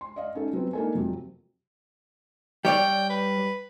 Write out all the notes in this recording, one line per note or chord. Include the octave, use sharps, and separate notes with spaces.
C6
D5 D#5 F5
C#4 D#4 A4
F#3 B3 C4
A#3 D4 D#4 A4 A#4 G#5
F2 C3 F#3
G3 C#5 D5 G5
B4